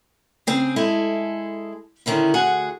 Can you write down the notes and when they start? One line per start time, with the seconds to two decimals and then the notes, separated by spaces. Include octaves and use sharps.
0.47 C#3 C4 G#4
0.76 G#3 E4 G#4 A4
2.06 D3 D#3 C#4 E4
2.34 D2 F#4 G#4 F#5